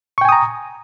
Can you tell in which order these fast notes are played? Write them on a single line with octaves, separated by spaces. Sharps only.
C#6 G5 G#5 D#6 A#5